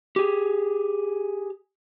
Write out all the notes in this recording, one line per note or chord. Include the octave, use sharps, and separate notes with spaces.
G4 G#4